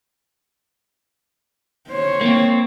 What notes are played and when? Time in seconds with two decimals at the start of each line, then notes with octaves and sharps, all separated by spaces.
1.89 C5 C#5
2.21 A#3 C4